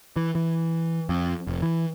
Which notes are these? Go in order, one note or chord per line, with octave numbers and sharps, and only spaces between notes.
E3
E3
F2
F1
E3